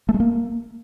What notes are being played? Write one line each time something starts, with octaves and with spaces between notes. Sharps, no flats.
A3
G#3
A#3